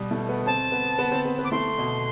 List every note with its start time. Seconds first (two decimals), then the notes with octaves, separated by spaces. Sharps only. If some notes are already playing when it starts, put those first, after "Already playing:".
Already playing: B2 G3
0.11 A3
0.29 B3
0.46 C4 A5
0.72 B3
0.99 B3
1.11 C4
1.25 B3
1.39 B3
1.44 D6
1.52 A3 C6
1.78 B2